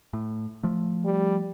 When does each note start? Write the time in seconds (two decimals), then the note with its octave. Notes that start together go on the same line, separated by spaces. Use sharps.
0.13 A2
0.63 F3 A3
1.05 G3